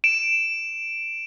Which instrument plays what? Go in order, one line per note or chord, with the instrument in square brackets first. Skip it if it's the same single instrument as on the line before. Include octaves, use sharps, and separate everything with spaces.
[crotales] D7 E7